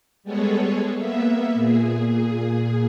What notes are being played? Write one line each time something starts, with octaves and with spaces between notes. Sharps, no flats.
G3 G#3 B3 G#4 A4 C#5
A#3 B3 E5
A#2 G#4